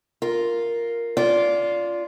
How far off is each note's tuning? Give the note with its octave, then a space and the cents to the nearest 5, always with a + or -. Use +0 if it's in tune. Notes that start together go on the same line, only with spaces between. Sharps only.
F4 +0 A#4 +0
C#4 +40 F4 -5 D5 -15